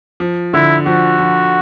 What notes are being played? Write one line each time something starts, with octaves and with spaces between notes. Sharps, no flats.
F3
D3 E4
F3 F#4
F3